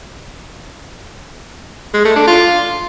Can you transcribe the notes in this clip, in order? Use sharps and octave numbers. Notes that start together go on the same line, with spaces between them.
G#3
A3
D4
F4